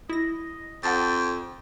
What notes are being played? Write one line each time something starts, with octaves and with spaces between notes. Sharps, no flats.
E4 D#5 A#6
F2 F#5 G5 A5 A6